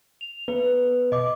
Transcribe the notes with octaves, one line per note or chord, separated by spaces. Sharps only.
F7
B3 B4
B2 D#5 D6